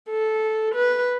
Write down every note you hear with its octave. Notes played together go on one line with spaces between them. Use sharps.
A4
B4